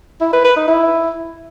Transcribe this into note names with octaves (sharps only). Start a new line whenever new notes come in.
E4
B4
B4
D#4
E4